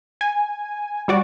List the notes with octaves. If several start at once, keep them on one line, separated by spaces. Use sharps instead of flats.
G#5
G3 F#4 D5